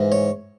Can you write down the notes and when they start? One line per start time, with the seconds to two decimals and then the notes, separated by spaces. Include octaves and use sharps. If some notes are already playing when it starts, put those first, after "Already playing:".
Already playing: G#2 E3
0.12 C#5